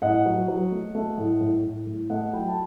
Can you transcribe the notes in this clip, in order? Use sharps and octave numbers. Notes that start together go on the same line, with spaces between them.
A2 D#5 F#5
F#3
F#3
A3
A3
A2
A2
A2
A2
A3 D#5 F#5
F#3 G5 B5
A5